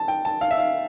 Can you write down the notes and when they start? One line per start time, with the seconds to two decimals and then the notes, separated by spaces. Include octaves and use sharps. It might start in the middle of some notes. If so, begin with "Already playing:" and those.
Already playing: A5
0.08 G5
0.25 A5
0.41 F5
0.51 E5
0.58 F5